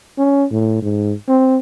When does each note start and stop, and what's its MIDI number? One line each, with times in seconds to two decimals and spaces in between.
0.18 0.45 61
0.51 0.80 45
0.82 1.13 44
1.28 1.58 60